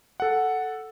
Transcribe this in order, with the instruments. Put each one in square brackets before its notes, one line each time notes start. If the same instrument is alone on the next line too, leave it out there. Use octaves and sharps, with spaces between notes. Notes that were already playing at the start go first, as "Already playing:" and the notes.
[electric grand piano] A4 F#5